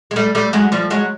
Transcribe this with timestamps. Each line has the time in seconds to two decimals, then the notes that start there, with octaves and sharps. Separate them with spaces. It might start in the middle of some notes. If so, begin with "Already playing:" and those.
0.11 G#3
0.16 G3 A3
0.35 G3 A3
0.53 F#3 G#3
0.72 F3 G3
0.90 F#3 G#3